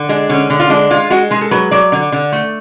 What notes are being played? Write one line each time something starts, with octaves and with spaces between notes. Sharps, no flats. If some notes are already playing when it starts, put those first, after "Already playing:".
Already playing: D3
G#3 D4
D3 C#4
D3
F4
G#3 D4
G#3 F4
G#3 F#4
G#3 G#4
A4
F#3 B4
F#3 D5
D3
D3
A3